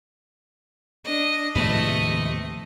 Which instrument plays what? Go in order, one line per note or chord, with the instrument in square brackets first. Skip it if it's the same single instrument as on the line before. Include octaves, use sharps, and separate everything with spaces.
[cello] D4 [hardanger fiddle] D#5
[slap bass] D#2 A2 G#3 [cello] C3 [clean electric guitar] F3 B4 [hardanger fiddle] A3 D#5